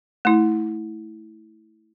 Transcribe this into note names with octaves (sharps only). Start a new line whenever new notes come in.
A3 E4